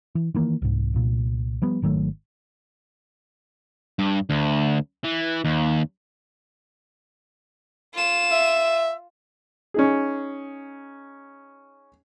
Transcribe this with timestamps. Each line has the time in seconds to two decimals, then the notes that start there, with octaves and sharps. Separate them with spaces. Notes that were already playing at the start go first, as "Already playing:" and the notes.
0.15 E3
0.34 D#3 E3 A#3
0.62 C2 G#2
0.94 C2 A#2
1.62 F3 G3 B3
1.82 G#1 D#3 F#3 A3
3.99 G2
4.30 D2
5.04 E3
5.45 D#2
7.94 F4 E7
8.32 E5
9.74 C#4 D#4 G#4